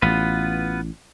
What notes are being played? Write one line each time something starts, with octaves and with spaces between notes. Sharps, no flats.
A1 B3 F4 B4